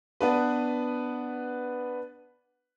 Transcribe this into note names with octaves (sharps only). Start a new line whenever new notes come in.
B3 D4 B4